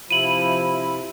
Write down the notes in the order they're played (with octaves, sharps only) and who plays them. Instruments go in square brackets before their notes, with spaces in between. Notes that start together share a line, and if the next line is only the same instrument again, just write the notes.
[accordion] C3 E4 [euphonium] F3 [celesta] D#7 F#7